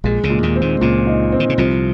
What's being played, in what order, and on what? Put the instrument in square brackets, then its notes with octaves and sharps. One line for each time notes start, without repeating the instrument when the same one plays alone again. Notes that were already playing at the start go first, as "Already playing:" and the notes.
[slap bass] A#1 A#2 [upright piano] G#3
[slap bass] C#2 C#3
[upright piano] A#2
[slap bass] D#2 D#3
[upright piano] C4
[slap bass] D#2 D#3
[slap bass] C#2 C#3 [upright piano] A#2
[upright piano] D#4
C4
[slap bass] D#3
C#3
[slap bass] C2 C3 [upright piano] F3